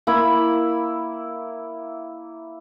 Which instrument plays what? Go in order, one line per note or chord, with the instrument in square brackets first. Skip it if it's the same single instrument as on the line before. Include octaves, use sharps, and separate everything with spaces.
[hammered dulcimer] A#3 E4 B5